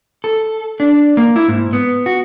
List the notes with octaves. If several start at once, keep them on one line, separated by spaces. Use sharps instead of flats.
A4
D4
A#3
E4
G#2
B3
F#4